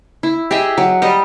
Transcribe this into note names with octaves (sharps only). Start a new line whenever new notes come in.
E4
G4 G#4 D#5 E5
F#3
G3 G4 D#5